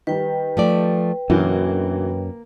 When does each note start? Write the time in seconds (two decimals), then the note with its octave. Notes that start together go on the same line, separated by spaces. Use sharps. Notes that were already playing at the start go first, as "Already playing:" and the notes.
0.07 D#3 G3 B4 G5
0.57 F3 A3 D5
1.30 F#2 B2 D3 E3 A#3